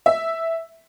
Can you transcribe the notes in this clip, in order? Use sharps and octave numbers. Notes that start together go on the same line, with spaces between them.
E5